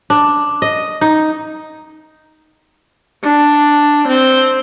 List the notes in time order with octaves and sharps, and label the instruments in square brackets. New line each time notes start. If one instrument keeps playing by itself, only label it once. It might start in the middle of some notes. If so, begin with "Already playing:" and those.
[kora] D4
D#5
D#4
[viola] D4
C4